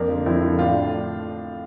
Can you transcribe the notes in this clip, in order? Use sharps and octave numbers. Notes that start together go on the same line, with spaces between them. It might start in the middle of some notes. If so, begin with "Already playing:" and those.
Already playing: F2 A#3 D4
D3 F3
F2 C4 E4
D3 F3
A2 D4 F4